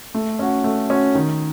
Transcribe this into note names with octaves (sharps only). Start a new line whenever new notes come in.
A3
C#4 F#4
A3
C#4 F#4
D#3